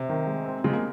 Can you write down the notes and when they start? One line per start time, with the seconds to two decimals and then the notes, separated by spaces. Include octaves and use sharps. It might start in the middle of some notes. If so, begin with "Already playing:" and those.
Already playing: C3
0.09 D#3
0.27 G#3
0.46 C4
0.64 C#3 G#3
0.73 A#3